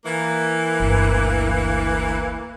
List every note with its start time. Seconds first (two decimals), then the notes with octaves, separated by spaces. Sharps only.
0.05 E3 A#3
0.80 G1 D2